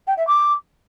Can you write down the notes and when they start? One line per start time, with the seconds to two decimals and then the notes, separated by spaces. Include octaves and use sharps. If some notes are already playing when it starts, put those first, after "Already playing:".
0.07 G5
0.17 E5
0.27 D6